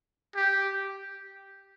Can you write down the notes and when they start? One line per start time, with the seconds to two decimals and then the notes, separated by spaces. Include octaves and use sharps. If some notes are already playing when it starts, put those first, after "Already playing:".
0.36 G4